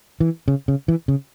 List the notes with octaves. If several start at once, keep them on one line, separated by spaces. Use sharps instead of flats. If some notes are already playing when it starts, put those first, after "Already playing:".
E3
C#3
C#3
E3
C#3